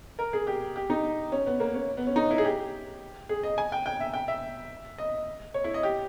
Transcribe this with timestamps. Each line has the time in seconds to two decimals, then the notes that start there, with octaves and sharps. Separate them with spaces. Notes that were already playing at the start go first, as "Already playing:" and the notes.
0.19 A#4
0.33 G#4
0.47 G4
0.76 G4
0.90 D#4
1.32 C#4
1.47 B3
1.60 A#3
1.74 C#4
1.97 B3
2.07 C#4
2.16 D#4
2.31 E4
2.38 G#4
2.45 G4
3.29 G#4
3.43 D#5
3.58 G#5
3.72 G5
3.86 G5
4.00 E5
4.14 G5
4.28 E5
4.98 D#5
5.54 C#5
5.64 E4
5.74 D#5
5.83 G4